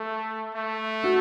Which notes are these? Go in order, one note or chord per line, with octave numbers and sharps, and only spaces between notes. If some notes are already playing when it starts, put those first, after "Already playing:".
Already playing: A3 A4
A3
F#4